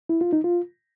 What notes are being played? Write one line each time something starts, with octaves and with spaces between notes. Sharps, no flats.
E4
F4
D#4
F4